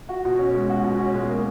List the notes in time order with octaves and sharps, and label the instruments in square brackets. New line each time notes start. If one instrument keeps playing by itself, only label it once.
[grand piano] F#4
B2
C#4
G#3
F#4
B2
C#4
G#3
A#3